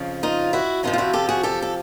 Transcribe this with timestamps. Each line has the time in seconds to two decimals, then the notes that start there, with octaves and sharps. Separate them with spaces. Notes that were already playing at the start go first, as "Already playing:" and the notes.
Already playing: F2 C#3 F3
0.23 D#4 F4
0.53 E4 F#4
0.83 F2 C3 F3 D#4 F4
0.93 F4
0.98 E4 F#4
1.13 G4 A4
1.29 F#4 G#4
1.43 G4 A4
1.62 A4